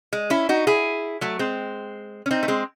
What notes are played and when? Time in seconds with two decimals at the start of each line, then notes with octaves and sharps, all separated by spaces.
0.13 G#3
0.30 C#4 E4
0.49 D#4 F#4
0.67 E4 G#4
1.21 F#3 A3
1.39 G#3 C4
2.26 C#4
2.31 C4 D#4
2.43 A3
2.48 G#3 C4